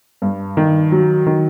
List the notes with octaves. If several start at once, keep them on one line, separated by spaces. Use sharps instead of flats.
G2
D#3
F#3
D#3